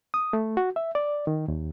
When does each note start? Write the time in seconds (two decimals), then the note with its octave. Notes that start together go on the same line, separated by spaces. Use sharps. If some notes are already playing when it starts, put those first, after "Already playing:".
0.14 D#6
0.33 A3
0.57 F#4
0.76 E5
0.95 D5
1.27 D#3
1.48 D#2